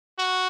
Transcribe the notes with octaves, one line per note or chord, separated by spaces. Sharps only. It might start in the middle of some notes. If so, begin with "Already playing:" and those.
F#4